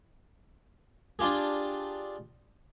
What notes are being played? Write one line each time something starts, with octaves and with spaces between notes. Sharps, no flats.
D4 F4 G4 G#4